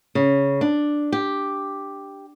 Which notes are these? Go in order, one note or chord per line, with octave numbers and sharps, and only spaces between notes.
C#3
D4
G4